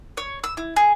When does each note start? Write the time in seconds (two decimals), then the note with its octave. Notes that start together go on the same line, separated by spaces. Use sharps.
0.17 C#5
0.44 E6
0.57 E4
0.76 G#4